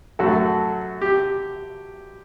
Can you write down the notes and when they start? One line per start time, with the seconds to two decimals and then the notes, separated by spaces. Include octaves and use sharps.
0.19 F#2 F#3 A3 F#4 A4
1.01 G4